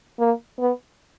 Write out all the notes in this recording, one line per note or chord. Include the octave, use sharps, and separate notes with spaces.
A#3
B3